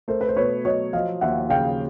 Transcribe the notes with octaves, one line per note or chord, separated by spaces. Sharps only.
A3 A#4 C5
B4
C5
B2 B4 C#5
F#3 C#5 D#5
F3 D#5 F5
D#2 E5 F#5
C#3 F5 G5